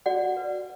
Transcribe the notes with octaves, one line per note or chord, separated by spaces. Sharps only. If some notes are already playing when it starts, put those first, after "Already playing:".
F#4 D5 F#5
B4